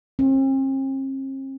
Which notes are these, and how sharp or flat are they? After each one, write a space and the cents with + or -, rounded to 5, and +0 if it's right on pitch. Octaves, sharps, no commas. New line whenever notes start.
C4 +45